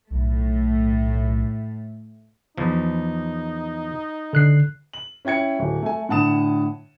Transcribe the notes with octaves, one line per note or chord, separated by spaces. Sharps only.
B1 A2 A3
E2 F3 D#4
D3 F#6 C7
F#7
C#4 E4 G5 G#6 C#7
D1
A3 G#5
A2 D3 F#5 A5 D#6 E7